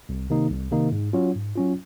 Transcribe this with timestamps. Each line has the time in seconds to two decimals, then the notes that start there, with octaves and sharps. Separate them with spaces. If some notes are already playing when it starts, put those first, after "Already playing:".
0.09 C2
0.30 C3 D#3 A#3 D#4
0.51 C2
0.71 C3 D#3 A#3 D#4
0.92 G#2
1.13 F#3 C#4 F4
1.35 G#2
1.55 F#3 C#4 F4